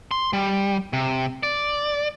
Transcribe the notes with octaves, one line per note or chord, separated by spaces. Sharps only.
C6
G3
C3
D5